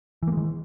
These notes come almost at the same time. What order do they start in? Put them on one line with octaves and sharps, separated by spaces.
E3 A#3 G#3 D#3